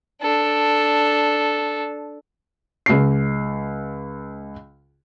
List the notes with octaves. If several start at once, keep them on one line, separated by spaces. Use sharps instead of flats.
D4 A4
C#2 C7